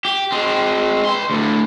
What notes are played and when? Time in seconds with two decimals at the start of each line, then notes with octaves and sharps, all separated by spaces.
0.05 G4
0.32 G#3 C4
1.05 B4 C6
1.30 D2 A2